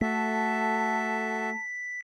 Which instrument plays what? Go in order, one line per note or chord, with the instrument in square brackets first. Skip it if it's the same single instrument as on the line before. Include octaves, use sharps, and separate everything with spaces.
[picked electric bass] A3 [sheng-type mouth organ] F#4 A4 E5 [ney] A5 [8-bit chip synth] B6